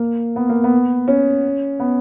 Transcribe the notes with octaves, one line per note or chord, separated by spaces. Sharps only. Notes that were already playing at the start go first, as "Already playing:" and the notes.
Already playing: A#3
B3
A#3
B3
C#4
B3